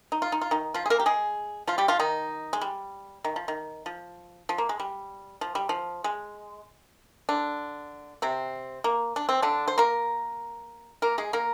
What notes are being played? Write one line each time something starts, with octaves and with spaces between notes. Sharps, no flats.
D#4
F4
D#4
F4
D#3 D#4
F3 F4
G#4
A#3 A#4
G4
G#3 G#4
F3 F4
G3 G4
F3 F4
D#3 D#4
G#3
G3
D#3
F3
D#3
F3
F3
A#3
G#3
G3
F3
G3
F3
G#3
D3 D4
C3 C4
A#3
D4
C4
D3 D4
C5
A#3 A#4
A#3 A#4
G#3 G#4
A#3 A#4